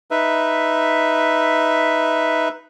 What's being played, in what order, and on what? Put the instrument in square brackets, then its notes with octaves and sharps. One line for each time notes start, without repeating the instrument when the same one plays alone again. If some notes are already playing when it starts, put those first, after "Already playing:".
[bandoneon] D#4 B4 E5